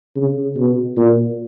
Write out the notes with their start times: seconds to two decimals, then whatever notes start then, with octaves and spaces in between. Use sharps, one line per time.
0.16 C#3
0.56 B2
0.96 A#2